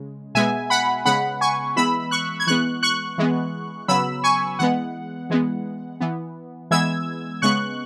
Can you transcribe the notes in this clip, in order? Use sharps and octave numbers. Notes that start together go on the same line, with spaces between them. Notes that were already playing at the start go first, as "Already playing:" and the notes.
Already playing: C#3 G#3
B2 G#3 B3 E5 G#5
F#5 B5
C#3 G#3 B3 F#5 B5
G#5 C#6
E3 G#3 B3 B5 E6
C#6 F#6
G#6
E3 G#3 B3 C#6 F#6
C#6 F#6
E3 G#3 B3
C#3 F#3 B3 B5 E6
G#5 C#6
E3 G#3 B3 F#5
E3 G#3 B3
E3 B3
E3 G#3 B3 E6 G#6
C#3 G#3 B3 C#6 F#6